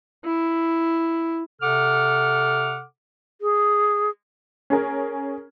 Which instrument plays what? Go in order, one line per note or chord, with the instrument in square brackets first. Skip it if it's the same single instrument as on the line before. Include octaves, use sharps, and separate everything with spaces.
[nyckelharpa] E4
[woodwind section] C3 A4 F#5 D6 F6
[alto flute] G#4
[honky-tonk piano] C#4 G#4 A#4